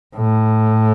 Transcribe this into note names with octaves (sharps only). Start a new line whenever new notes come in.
A2